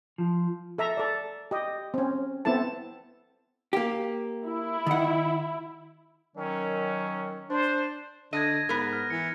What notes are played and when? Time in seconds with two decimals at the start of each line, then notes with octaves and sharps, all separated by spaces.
0.18 F3
0.78 A4 E5 A#5
0.97 A4 D5
1.51 G4 D#5
1.94 C4 C#4
2.45 B3 C4 E4 A4 A5
3.73 A#3 G4
4.45 E4
4.87 D#3 F#5
6.37 D#3 F#3 C#4
7.50 D4 C5
8.33 D3 D#5 G#6 A#6 D#7
8.69 G#2 B3 A#4
8.93 F6
9.10 E3 C#7